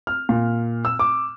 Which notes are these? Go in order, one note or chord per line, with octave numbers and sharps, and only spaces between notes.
F6
A#2
E6
D6